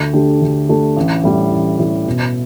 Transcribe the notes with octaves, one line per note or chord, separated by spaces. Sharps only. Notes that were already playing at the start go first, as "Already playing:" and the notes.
Already playing: D2
D3 A3 D4 G4
D2
D3 A3 D4 G4
A1
A2 G3
A1
A2 G3
B2